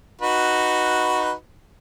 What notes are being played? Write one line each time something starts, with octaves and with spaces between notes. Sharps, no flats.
D#4 F#4 B4